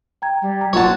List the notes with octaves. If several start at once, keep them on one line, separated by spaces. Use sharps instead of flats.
G5 A#5 G#6
G3
A#5
F#3 F4 F#4 C#5 F#5 A5